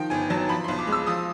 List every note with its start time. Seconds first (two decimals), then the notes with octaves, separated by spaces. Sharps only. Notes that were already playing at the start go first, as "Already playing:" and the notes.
Already playing: D#3 F3 G5
0.10 G1 G#5
0.30 F#3 A5
0.49 F3 B5
0.64 B1 C6
0.79 D6
0.87 G#3
0.92 E6
1.06 F3 D#6